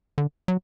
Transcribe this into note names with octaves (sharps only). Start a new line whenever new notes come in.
D3
F#3